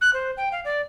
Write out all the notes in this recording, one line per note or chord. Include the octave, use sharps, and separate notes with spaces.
F#6
C5
G5
F5
D5